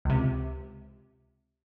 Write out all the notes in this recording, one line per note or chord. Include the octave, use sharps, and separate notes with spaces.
C#2 C3